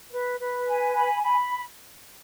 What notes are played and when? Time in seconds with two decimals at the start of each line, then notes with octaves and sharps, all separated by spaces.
0.12 B4
0.40 B4
0.66 G#5
0.94 B5
1.22 B5